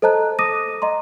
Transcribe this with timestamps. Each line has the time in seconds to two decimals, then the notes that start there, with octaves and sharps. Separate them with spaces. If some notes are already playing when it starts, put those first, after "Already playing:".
0.02 A4 C5 D#5 A5 A#5 F#6
0.39 D6 D#6 A#6 D#7
0.82 D#5 A#5 C6